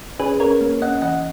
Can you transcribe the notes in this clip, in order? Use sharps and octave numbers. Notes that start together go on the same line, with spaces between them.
C#4 G#4 B4
C#4 A#4 C#5
A#3
C#4 D#5 F#5
E3 D#5 F#5